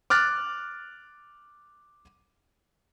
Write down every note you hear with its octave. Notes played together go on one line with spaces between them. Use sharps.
D6 F6 F#6 A6